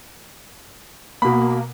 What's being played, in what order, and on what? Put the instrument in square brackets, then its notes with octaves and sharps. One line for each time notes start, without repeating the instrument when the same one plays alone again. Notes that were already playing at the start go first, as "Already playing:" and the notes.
[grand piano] B2 B5 [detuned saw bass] A#3